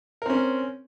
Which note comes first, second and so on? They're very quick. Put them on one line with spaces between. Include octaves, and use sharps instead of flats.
A#4 C4 C#4